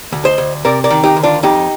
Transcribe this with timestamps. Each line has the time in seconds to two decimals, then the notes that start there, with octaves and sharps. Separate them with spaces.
0.12 D2
0.25 C5 D#5
0.38 D2
0.65 C3 A#4 D5
0.84 A#4 D5
0.90 D#3
1.04 D#4 G4
1.17 D2
1.23 D4 F4
1.43 F2 D#4 G4